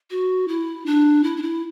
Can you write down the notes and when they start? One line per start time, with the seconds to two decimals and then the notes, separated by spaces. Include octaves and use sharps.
0.11 F#4
0.48 E4
0.86 D4
1.24 E4
1.37 D4
1.42 E4